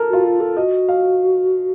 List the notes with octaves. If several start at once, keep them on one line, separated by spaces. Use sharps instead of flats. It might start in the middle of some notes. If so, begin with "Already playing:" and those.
Already playing: A4 A#4
F4 F#4
F4
A4
F#4 D#5
F5